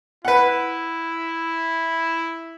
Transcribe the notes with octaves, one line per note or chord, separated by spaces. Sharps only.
E4 B4 F#5